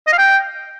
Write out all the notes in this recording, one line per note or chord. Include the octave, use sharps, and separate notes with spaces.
D#5
F5
G5